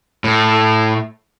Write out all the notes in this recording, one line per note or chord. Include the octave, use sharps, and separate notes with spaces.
A2